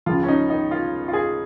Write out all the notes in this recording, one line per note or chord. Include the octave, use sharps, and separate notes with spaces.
C#2 C#3 F3 F4
C#4
D#4
D#4
F4
F4
G#4